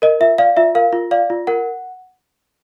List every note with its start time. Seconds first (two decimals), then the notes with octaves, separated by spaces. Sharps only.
0.02 A#4 D#5
0.20 F4 E5
0.38 D5 F5
0.57 F4 E5
0.75 A#4 F5
0.93 F4
1.11 D5 F5
1.30 F4
1.47 A#4 F#5